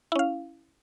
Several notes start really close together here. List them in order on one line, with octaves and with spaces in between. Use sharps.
E4 C#4 F5